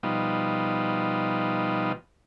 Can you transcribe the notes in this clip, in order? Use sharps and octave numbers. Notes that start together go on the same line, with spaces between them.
B2 F3 G3 D#4